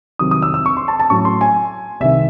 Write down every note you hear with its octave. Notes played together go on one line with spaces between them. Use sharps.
C2 C3 D#3 F#3 C4 D#6
D#6
E6
E6
C#6
C6
A5
A5
A2 F#3 C#4 C#6
C6
G#5
C2 C3 D#3 E5